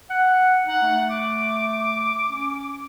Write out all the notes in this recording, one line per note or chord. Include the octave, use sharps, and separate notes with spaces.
F#5
D#4 F#5
A3
D6
C#4